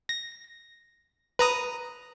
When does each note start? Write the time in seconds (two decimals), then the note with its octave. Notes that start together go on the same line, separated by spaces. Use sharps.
0.09 A#6
1.39 B4 A#5 D#6